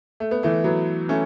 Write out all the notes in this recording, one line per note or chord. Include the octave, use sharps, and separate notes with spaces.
A3
B3
E3 A3
F#3 B3
A3 C#4